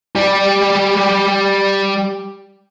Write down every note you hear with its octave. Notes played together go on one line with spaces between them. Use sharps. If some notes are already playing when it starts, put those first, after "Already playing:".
G3 G4